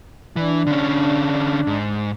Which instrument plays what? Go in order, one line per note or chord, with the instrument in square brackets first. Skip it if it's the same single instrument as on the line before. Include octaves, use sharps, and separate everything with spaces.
[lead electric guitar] E3 [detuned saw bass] D4
[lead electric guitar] D3 C#4
G#2